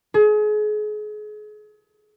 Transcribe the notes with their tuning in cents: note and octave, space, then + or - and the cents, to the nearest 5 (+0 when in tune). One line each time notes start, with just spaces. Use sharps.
G#4 +35